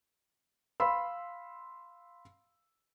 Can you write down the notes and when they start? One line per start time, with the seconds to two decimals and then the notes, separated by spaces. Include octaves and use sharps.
0.80 F5 B5 C6 E6